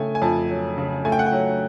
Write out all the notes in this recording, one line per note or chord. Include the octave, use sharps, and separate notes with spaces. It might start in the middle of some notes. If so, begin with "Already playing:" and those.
Already playing: C#3 A3 G5 G#5
G#5
F2 A5
F#3
C#3
A3 G#5
G5
F#5
G5
F#3